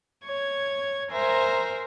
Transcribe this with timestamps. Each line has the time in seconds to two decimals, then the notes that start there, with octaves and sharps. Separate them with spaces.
0.25 C#5 G#6
1.11 A#4 C5 E5 G#5 A#5